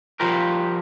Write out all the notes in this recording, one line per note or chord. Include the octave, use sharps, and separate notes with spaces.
F3 G3 F4 G4 A#4